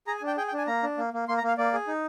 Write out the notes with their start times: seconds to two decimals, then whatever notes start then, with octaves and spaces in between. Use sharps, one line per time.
0.07 G#4 A#5
0.17 G#5
0.22 D4 G5
0.37 G#4 G5
0.48 G5
0.53 D4 G#5
0.67 A#3 A#5
0.83 D4
0.98 A#3
1.13 A#3
1.28 A#3 C6
1.38 A#5
1.43 A#3 F5
1.57 A#3 D5
1.73 G#4
1.88 D#4